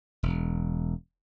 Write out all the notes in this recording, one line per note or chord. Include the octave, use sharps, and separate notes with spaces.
E1